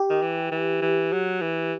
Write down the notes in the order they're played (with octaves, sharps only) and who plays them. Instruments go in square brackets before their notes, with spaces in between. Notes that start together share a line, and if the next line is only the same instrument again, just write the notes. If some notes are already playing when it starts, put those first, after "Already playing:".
Already playing: [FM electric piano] G4
[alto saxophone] D#3
E3
E3
E3
F#3
E3